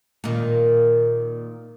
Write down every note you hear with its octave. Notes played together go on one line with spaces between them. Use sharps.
A#2 D#3